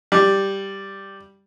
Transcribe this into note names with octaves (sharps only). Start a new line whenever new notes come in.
G3